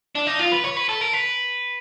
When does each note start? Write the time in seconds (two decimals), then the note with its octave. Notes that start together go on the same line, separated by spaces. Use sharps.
0.15 D4
0.27 D#4
0.39 F4
0.52 B4
0.64 C#5
0.77 B4
0.89 A4
1.01 A#4
1.13 B4